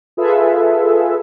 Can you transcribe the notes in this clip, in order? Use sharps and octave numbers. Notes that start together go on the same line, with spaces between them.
F4 G#4 A4 B4 E5